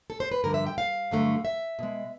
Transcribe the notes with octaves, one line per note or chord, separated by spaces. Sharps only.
A4
C5
B4
G2 D3 F3 A#4
E5
G5
F5
G2 D3 F#3 A3
E5
B2 G#3